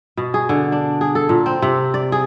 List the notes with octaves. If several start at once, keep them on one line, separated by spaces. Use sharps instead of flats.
B2
G#4
D3
D4
G#4
A4
A#2
C4
C3
D5
G#4